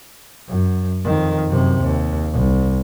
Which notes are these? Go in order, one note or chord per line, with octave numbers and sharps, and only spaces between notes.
F#2
F2 D#3
F#2 C3
D#2
C2